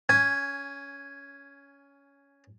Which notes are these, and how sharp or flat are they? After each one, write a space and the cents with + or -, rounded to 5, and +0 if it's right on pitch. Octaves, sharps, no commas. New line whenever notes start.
C#4 +15 G#5 +0